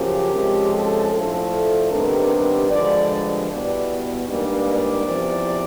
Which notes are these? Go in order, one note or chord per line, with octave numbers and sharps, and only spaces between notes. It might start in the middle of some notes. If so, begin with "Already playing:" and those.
Already playing: F#2 C#3 F3 A#3 G4
C3 F3 G#3 C#4
A4
A2 F3 A3 D4 A4
C3 D#3 G3 B3 D4 A#4
G2 D3 F3 G#3 D5
E2 B2 G3 D5
G#2 E3 G3 A#3 D4
D5
E2 C3 F3